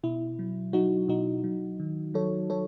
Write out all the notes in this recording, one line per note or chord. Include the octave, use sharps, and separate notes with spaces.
B2 E4
F#3
F#3 D#4 F#4
B2 D#4 F#4
F#3
D#3
F#3 A4 C#5
F#3 A4 C#5